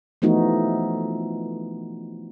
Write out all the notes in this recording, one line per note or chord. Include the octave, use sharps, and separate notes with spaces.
E3 F3 A3 B3 D#4 F#4